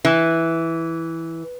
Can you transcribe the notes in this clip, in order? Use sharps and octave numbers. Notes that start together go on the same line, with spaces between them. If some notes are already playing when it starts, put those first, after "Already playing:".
E3